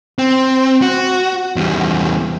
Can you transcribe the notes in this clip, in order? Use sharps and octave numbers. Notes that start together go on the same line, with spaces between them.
C4
F#4
E2 G3